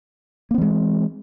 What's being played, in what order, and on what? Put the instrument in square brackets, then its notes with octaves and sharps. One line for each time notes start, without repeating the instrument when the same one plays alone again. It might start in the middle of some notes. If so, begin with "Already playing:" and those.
[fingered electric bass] A#3
C4
E3
G#3